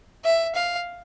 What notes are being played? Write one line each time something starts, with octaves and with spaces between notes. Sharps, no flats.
E5
F5